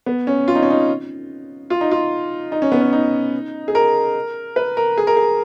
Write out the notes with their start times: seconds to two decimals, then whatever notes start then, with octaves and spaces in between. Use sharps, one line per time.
0.06 B3
0.27 C#4
0.48 F4
0.55 D#4
0.63 C#4
0.70 D#4
1.70 F4
1.81 D#4
1.91 F4
2.52 D#4
2.62 C#4
2.72 B3
2.81 C#4
2.93 D#4
3.68 G#4
3.75 A#4
4.56 B4
4.77 A#4
4.98 G#4
5.07 A#4
5.17 G#4